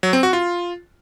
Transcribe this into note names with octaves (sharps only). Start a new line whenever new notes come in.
F#3
C4
F#4
F4